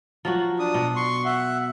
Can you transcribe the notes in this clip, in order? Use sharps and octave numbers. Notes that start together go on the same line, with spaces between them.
F3 F#3 F#4
D4 D#6
B2
C6 C#6
E5 F#5